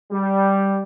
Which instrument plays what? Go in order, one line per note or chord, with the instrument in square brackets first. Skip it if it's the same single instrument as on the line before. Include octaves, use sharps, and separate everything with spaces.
[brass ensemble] G3